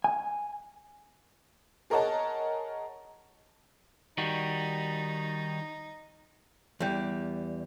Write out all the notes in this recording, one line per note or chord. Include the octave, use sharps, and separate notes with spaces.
G#5
G#4 A#4 C#5 D#5 F#5 A5
D#3 G3 D#4 F#4
E2 G3